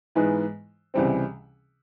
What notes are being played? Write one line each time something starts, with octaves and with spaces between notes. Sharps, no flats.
G#2 E3 G#3 B3
C#2 C3 E3 G3 C4